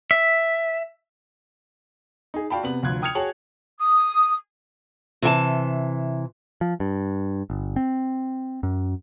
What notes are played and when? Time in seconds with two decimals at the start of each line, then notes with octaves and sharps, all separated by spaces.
0.11 E5
2.34 D#4 G#4
2.50 F#4 D5 F5 G5 A5 B5
2.63 C3 B3 F#7
2.82 F1 D2 F3 F4 F#6 G#6
3.02 G5 D#6 F6 G#6 C#7 F7
3.15 F#4 G#4 C#5 G5 A5 F#7
3.80 D#6
5.22 C3 E3 G5 A5
6.61 F3
6.80 G2
7.50 G1
7.76 C4
8.63 F#2